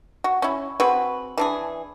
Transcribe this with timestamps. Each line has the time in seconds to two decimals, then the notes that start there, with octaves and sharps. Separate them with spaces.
0.24 F#4
0.42 C#4 E4
0.80 C4 F#4 G#4 B4
1.38 E3 D4 G#4